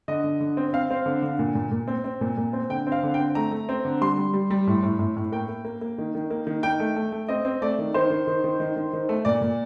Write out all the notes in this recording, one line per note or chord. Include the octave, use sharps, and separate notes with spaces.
D3 D#5
D3
D3
C4
C4 F5
C4
D3
D3
A#2
A#2
A#2
C4
C4
A#2
A#2
C4
D3 G5
C4
F5
D3
C4 G5
A3 A#5
A3
C4
D3
G3 C6
G3
G3
G3
A2
A2
A2
A2
A#3 G5
A#3
A#3
A#3
D#3
D#3
A#3
D#3
D#3 G5
A3
A3
A3
C4 D#5
C4
A3 D5
D#3
D#3 C5
D#3
D#3
D#3
D#3
D#3
D#3
A3
A#2 D5
A#2